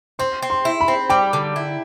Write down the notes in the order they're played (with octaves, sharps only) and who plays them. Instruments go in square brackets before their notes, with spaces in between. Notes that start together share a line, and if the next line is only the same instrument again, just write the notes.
[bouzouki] C4 [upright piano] C6
[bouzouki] C4
[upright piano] C6
[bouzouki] E4
[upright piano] B5
[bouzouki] C4
[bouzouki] G3 [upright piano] G5
[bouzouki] D3
E4